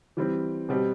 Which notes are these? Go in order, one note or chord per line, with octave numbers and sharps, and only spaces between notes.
E3 G3 C4
B2 G3 C4 G4